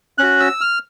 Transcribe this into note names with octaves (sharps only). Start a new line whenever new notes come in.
C#4 F#4 F#6
E6
F6